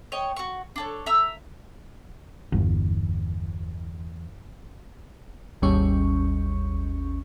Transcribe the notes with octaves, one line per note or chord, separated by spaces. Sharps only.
C#5 D#5 G5
F#4 C#6
D4 A4 C#5
E5 A#5 E6
G1 E2 E3
G#1 D#2 G3 C#4 C#6